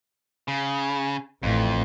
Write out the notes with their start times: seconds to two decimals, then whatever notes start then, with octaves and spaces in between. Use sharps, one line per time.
0.48 C#3
1.43 A1 F2